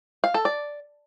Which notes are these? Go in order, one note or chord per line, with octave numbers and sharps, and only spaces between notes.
F5
A4
D5